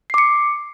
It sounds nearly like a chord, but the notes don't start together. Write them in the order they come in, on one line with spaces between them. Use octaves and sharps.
C7 D6 C#7